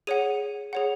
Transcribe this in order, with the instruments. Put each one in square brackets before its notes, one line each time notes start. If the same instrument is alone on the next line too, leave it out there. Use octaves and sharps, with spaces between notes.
[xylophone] G#4 C#5 F#5 D#7
G#4 C#5 F#5